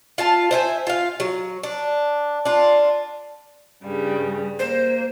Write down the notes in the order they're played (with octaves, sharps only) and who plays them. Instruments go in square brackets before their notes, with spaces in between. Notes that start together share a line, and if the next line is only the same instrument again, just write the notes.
[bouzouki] F4 F5 A5
C5 E5 G#5
F4 F5
F#3
D4
D4 F4
[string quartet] G2 C#3 G3
[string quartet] A#3 [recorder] C5